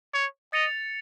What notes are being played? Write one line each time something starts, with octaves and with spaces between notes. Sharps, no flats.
C#5
D#5 A6 C#7 F7